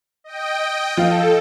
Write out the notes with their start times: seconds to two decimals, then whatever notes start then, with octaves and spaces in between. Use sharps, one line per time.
0.24 D#5 G5
0.97 F3 A4 F5